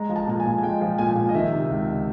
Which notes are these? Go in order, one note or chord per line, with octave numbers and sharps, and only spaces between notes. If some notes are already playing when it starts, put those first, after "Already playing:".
Already playing: G#3 A#5
F3
A5
A#2 A5
G#5
A#2
G#5
G#3 G5
F3
A#2 G#5
A#2
D#5
D#3 E5
C3
C#2